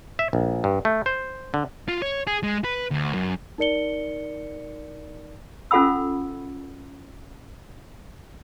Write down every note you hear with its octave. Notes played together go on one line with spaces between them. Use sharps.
E5
A#1
G2
A3
C5
D3
F4
C#5
G#4
G#3
B4
D2
F#2
D#4 A#4 D5 C#7 G7
C#4 F4 A4 F#5 B5 E6